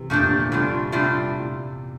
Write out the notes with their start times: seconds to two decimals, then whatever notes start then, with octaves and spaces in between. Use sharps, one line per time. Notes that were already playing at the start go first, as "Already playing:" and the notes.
Already playing: C3 E3
0.10 A#2 D3 F3 A3 D4 G4
0.20 A#2
0.31 C3
0.41 A#2
0.51 A2 C3 G3 D4 F4
0.92 A2 C3 G3 D4 F4